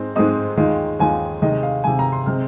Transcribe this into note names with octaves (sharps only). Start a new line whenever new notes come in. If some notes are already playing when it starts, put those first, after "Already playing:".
Already playing: G#2 G#3 C4 D#4
G#2 G#3 C4 D#4 D#6
D#2 D#3 G#3 F4
D#2 D#3 G#3 F4 G#5
C3 D#3 G#3 D#5
F5
C3 D#3 G#3 G#5
A#5
C6
C3 G#3 C4 F6